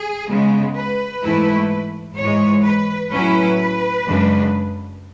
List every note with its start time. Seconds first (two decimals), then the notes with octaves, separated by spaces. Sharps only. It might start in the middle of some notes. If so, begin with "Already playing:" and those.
Already playing: G#4
0.29 C#3 G#3 B3
0.75 B4
1.22 G#2 E3 A3 E4
2.17 G#2 E3 G#3 C#5
2.64 B4
3.12 A2 F#3 C#4 E4 B4
4.06 F#2 C#3 G#3 D4